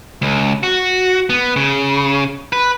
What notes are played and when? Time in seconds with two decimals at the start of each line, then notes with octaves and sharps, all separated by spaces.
0.22 C#2
0.63 F#4
1.30 B3
1.56 C#3
2.53 B4